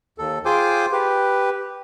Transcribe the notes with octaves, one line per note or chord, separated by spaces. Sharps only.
D#2 A4
F4 G#4 C5 G5 G#5 D6
G4 B4